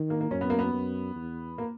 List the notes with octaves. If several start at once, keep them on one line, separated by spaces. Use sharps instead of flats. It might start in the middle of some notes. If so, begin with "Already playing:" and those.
Already playing: D#3
A#3
A#3
F#2 C#4
B3
A#3
B3
F#2
E2
A#3